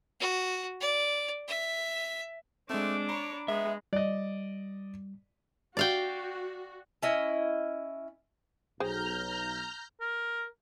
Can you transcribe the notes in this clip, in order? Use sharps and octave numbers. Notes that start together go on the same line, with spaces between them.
F#4
D5
E5
G#3 A3 C4 D4 D6
C#5 A#5 B5
G#3 B3 E5
G3 D5 D#5
F#4 D5 F5 G5
C#4 E4 D#5
B1 G#4 C5 G5 A#5 F6 G6
A#4